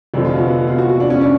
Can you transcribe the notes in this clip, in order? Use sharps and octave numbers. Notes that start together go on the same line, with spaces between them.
F1 F2 D3 F3 D4
F4
F#4
B3
F4
F#4
F#4
D4
C#4
D4